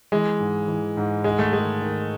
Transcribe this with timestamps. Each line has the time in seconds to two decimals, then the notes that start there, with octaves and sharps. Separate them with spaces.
0.12 E3 G#3
0.40 G#2
0.68 E3
0.97 G#2
1.24 G#2 G#3
1.39 A3
1.53 D#3 G#3
1.81 D#3